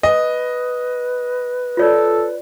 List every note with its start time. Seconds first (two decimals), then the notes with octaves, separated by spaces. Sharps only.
0.03 B4 D#5
1.77 F4 A4 C#5 D5